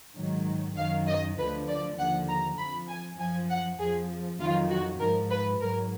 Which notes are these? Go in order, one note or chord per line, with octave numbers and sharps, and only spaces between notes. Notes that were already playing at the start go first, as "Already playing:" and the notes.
G#2 D#3 F#3
F#2 D#3 F#3 F5
D#5
D2 D3 F3 B4
D5
D#2 D3 F3 F#5
A#5
F2 F3 B5
G#5
F#2 F3 G#5
F#5
F2 F3 G#4
F2 D#3 F#3 F4
F#4
G#2 F3 A#4
B4
G#2 F#3 A#4